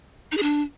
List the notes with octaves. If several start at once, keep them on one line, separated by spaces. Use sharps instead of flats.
D#4
G#4
D4